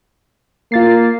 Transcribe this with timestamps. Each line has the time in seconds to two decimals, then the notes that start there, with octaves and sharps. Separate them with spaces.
0.72 A#3 F4 A6 C7